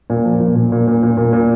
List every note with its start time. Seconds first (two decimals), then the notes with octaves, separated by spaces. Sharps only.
0.10 A#2
0.25 F3
0.40 A#2
0.55 A#2
0.72 A#2
0.88 A#2
1.03 A#2
1.17 A#2
1.33 A#2